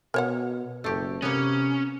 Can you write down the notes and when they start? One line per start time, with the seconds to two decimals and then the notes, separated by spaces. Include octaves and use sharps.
0.14 B2 A#4 C#5 F#5
0.84 F#1 A3 G4
1.22 C3 A#3 B3 C#4